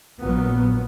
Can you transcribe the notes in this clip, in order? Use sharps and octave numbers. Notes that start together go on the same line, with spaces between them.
A#1 A#2 F#3 B3